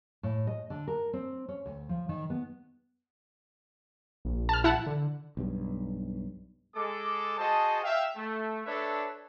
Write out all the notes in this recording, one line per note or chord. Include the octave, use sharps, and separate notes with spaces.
A2
D#5
D3
A#4
C4
C#4
D2
F3
D#3
B3
A#1
A5 F6
E4 F#5 A5
D3
B1 G2
G#3 A4 D6
F#4 G#4 C5 D#5 A5
E5 F5 G5
A3
D4 A4 B4 C#5 D5 E5